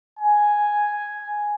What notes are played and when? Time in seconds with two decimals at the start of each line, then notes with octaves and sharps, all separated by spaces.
0.20 G#5